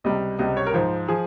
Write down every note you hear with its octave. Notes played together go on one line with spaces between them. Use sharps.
C#2 C3 G3 D#5
C#2 C3 G3 D#5
C#5
A#4
G#2 F3 C5
F3 G#4